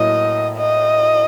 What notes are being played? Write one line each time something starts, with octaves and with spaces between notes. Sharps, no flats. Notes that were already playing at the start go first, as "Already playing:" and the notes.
Already playing: A2 F#3 A#3 D#5
D#5